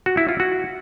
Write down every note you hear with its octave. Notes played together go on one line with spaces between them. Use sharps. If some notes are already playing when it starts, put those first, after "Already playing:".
F#4
E4
F4
F#4